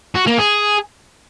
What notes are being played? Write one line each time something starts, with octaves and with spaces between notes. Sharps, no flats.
F#4
A#3
G#4